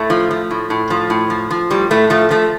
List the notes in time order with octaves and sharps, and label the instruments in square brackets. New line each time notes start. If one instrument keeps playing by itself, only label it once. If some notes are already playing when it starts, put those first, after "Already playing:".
Already playing: [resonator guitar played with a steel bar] A2 A3
F3
F3
A2
A2
F3
A2
F3
F3
A2 G3
A2 A3
F3 A3
F3 A3